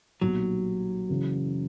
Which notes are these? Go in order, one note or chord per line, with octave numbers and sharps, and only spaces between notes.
B1 A#2 F#3 G3 A#3 D#4
F#1 F#2 C#3 E3